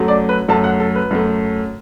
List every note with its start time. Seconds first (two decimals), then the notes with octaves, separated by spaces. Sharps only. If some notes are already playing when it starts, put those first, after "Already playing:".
Already playing: F#2 F#3 A3
0.08 D5
0.29 B4
0.48 F#2 F#3 A3 A5
0.64 F#5
0.80 A4
0.96 B4
1.11 F#2 F#3 A3